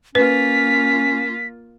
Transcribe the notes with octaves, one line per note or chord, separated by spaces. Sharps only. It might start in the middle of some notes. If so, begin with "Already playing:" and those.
A#3 C#4 F4 B4 B6